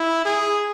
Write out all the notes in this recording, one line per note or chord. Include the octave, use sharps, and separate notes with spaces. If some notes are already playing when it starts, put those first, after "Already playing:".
Already playing: E4
G#4